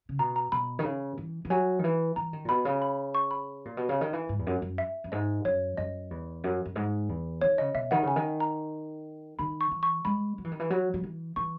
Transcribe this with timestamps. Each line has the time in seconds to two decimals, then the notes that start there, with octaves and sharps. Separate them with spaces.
0.09 C#3
0.19 B2 A#5
0.36 A#5
0.52 B2 B5
0.79 D#3
0.84 C#3
1.18 E3
1.45 E3
1.50 F#3 G#5
1.79 D#3
1.84 E3
2.16 E3 A#5
2.33 D#3
2.45 A#2
2.49 B2 B5
2.65 C#3
2.82 B5
3.15 C#6
3.31 B5
3.65 A#2
3.77 B2
3.89 C#3
4.01 D#3
4.13 E3
4.29 G#2
4.39 E2
4.47 F#2
4.62 F#2
4.78 E5
5.04 F#2
5.12 G#2 D#5
5.45 F#2 C#5
5.77 F#2 D#5
6.11 E2
6.44 F#2
6.65 F#2
6.75 G#2
7.09 E2
7.42 D#3 C#5
7.58 C#3 D#5
7.74 B2 E5
7.91 D#3 F#5
8.03 C#3 G#5
8.16 D#3
8.40 A#5
9.39 D#3 B5
9.61 C#6
9.71 E3
9.83 C#6
10.05 G#3 B5
10.38 F#3
10.44 E3
10.52 D#3
10.60 E3
10.70 F#3
10.94 F#3
11.04 E3
11.36 E3 C#6